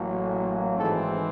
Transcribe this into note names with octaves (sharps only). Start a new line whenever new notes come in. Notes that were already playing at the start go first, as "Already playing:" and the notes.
Already playing: A1 A2 F#3 A#3
G#1 G#2 E3 G#3 A3 C4 A4